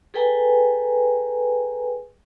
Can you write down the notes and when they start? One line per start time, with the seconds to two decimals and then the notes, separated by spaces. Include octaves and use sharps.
0.14 G#4 A4 B4 G5 G#5 A#5